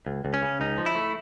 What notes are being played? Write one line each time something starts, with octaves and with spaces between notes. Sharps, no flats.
C#2
C#2
C#4
C#3
C#2 D#4
F3
E4
A3